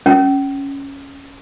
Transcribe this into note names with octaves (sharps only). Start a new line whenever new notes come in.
C#4